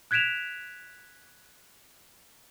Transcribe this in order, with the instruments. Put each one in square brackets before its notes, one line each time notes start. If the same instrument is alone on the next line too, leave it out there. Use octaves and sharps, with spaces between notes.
[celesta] F#6 G#6 B6 D7 E7 F7